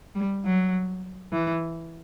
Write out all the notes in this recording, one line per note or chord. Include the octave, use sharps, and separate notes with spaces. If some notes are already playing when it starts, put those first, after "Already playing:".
G3
F#3
E3